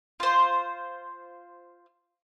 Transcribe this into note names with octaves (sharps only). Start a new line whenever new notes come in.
F4 C5